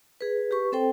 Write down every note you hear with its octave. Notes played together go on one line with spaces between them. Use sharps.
G#4 B4
G4 B4 C#6
C4 A4 C5 G5